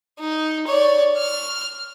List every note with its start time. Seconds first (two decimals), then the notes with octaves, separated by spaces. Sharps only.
0.19 D#4
0.67 C#5 D5
1.18 F6